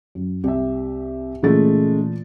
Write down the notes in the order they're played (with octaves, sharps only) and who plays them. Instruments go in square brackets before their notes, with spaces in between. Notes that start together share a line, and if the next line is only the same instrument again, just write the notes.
[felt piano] F#2
[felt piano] C2 [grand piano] G4 E5
[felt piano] A#2 E3 A6 [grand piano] C#3 G#3 A3